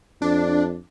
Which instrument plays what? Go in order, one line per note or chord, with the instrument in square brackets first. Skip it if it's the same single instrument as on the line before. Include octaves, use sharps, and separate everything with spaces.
[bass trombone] F2 [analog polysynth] D4